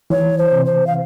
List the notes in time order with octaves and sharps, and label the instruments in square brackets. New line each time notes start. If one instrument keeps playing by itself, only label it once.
[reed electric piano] E3 [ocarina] C#5
[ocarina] C5
[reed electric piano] C3
[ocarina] C5
F5